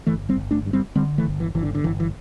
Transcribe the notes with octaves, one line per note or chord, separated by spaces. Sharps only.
G1 E3 A3
G3 C4
G1
A3 D4
G2
G3 C4
D3 G3 C4
E3 A3
G1
E3
G1 E3
D3
D3
G1 E3
E3